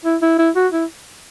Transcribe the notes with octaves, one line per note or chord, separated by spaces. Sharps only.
E4
E4
E4
F#4
E4